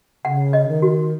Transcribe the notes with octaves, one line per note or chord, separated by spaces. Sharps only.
C#3 F#5
D#5
D#3
F#4